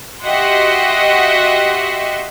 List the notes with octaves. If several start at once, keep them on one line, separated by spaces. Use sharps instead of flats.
F#4 G4 D#5 E5 F#5 C6